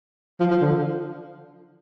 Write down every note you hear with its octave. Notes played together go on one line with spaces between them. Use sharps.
F3
F3
D3